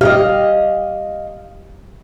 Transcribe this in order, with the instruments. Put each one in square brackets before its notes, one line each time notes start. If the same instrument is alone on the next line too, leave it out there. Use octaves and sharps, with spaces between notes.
[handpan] G4 [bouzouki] D#5 F5